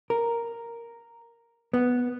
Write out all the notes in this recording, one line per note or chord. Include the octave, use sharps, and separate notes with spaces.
A#4
B3